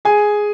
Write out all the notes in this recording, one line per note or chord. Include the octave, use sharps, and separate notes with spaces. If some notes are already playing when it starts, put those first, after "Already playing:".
G#4 G#5